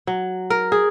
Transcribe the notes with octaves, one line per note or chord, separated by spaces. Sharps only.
F#3
A#4
G#4